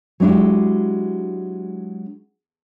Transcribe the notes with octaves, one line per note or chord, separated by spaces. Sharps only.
F#3 G#3 D4 E4 G4